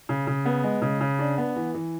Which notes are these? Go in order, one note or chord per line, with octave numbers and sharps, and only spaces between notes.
C#3
C#3
B3
G#3
C#3
C#3
D4
B3
E3
E3